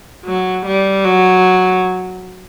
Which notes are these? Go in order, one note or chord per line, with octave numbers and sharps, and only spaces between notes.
F#3
G3
F#3